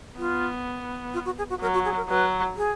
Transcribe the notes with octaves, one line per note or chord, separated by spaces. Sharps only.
B3 F4
F4
F#4
G#4
F#4
F#3 A#4
F#4
G#4
A#4
F#3 B4
G#4